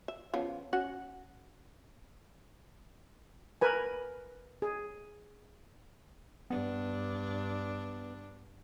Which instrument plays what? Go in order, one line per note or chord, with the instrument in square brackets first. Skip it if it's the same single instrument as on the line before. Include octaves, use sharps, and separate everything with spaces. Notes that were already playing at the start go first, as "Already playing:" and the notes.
[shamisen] E5
C#3 F3 B3
C#4 F#4 F#5
[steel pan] A#4 B4 G#5
G#4
[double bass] G2 [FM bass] B3 [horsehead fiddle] D4